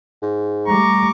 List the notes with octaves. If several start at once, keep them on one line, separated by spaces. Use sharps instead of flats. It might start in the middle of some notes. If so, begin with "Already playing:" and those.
G#2
G3 A3 A#5 C#6 D6